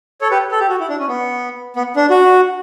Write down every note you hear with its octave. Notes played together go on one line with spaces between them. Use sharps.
A4 C#5
G4 B4
A4
G4
F#4
E4
D4
C#4
B3
B3
D4
F#4